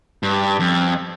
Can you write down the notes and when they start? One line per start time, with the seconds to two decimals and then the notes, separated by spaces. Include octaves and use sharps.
0.23 G2
0.60 F2